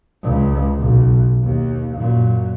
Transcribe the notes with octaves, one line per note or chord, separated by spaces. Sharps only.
C#2
B1
D#2
F#2 A#2